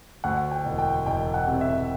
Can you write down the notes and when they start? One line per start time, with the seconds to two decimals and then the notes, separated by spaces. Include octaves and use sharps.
0.24 D2 F#5
0.51 G5
0.65 E1
0.78 G5
1.06 E1 G5
1.34 F#5
1.47 C3
1.61 E5